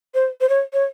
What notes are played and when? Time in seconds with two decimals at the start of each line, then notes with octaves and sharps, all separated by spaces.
0.15 C5
0.41 C5
0.49 C#5
0.73 C#5